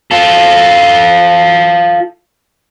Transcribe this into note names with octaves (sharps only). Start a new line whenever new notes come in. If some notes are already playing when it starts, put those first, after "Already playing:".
F4 A4